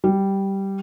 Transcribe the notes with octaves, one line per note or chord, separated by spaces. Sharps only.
G3